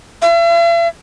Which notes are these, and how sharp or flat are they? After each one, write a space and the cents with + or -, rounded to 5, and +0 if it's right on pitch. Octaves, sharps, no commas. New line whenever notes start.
E5 +45